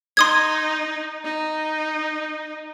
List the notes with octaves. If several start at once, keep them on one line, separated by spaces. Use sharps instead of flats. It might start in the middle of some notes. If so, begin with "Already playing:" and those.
D#4 C6 D#6 G#6
D#4